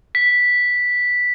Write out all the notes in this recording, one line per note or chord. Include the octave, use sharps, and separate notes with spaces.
B6